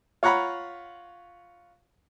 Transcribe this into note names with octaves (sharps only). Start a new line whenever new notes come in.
F4 C#5 F#5 A#5 B5